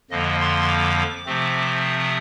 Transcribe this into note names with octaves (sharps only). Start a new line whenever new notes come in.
F2 D3 F3 A#3 D#5
C6
D6
C3 F3 A3 C4
D#6